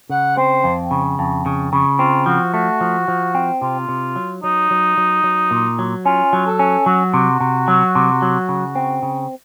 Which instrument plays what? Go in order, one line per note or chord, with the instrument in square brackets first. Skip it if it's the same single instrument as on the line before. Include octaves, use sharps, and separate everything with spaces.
[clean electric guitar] C#3 [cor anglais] F#5
[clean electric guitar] C4 [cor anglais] C5
[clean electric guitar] F2
C#3
F2
C#3
C#3
[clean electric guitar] C4 [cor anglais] F4
[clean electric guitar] F3 [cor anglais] F#4
[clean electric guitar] A3 [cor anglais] F#4
[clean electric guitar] F3
F3
C4
[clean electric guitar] C3 [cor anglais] F4
[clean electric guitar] C3
F#3
[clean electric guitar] F#3 [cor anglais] D#4
[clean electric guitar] F#3
F#3
F#3
A#2
F#3
[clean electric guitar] C#4 [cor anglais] F4
[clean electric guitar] F#3
[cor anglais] A4
[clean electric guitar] C#4
[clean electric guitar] F#3 [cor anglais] F#4
[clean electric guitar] C3
C3
F#3
C3
F#3
C#3
C4
C#3